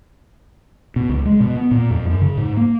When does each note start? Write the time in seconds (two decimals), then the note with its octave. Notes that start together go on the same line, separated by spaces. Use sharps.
0.96 B2
1.09 C#2
1.26 G#3
1.41 B2
1.56 B3
1.71 A#2
1.91 F2
2.10 F#2
2.22 C#3
2.37 G#2
2.57 A#3